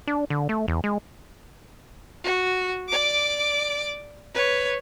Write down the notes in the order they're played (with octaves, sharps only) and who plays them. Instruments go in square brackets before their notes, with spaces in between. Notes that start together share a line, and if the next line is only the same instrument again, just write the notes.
[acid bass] D4
D3
A3
E2
G#3
[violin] F#4
D5 D6
B4 C#5